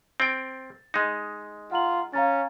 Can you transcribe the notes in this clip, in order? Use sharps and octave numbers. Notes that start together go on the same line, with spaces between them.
C4 G5 A6
G#3 D#4
F4 F#5 A#5 F#7
C#4 F5 A#5 A6